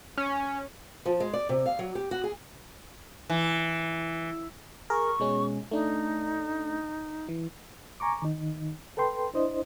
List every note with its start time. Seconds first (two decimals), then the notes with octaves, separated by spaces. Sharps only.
0.18 C#4
1.05 F3
1.20 G#3
1.33 D5
1.49 C3
1.66 F5
1.79 F#3
1.95 G4
2.11 F#4
2.24 G#4
3.30 E3
4.90 G#4 A#4 C#6
5.20 B2 G#3 C#4
5.71 A3 D4 D#4
7.28 E3
8.00 G#5 A#5 C#6 D6
8.22 D#3 D#4
8.97 A4 B4 G5 C6
9.34 D4 E4 C5 D#5